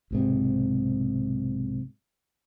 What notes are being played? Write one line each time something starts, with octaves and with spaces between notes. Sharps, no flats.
B1 G#2 C3